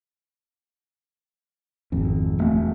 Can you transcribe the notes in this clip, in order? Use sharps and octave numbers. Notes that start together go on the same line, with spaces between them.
G#1 F2
E1 A3 B3